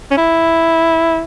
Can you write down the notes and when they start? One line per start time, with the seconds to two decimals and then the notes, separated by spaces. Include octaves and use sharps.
0.11 C#4
0.17 E4